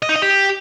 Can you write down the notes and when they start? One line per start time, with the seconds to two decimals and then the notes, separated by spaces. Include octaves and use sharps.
0.03 D#5
0.09 D#4
0.16 D#5
0.22 G4